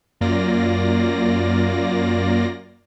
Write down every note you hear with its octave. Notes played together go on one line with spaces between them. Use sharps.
F#2 A#3 F4 D5 A#6